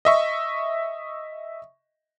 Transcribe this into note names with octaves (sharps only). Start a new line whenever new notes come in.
D#5 E5 C#6